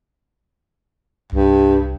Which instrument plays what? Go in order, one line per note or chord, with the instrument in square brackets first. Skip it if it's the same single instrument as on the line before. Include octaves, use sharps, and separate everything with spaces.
[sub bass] C2 [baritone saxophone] G2